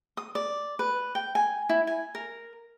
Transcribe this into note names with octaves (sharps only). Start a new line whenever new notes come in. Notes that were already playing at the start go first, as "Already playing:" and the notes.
D#6
D5
B4
G5
G#5
E4
G#5
A#4